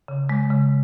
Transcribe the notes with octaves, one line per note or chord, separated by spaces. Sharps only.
C#3
G#3
C#3